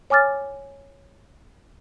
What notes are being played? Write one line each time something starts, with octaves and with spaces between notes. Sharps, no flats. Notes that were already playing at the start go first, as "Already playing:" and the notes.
C#5 G#5 D6 F6 A6